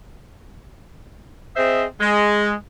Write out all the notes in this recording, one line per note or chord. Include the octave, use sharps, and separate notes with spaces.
C4 G#4 C5 D#5 E5
G#3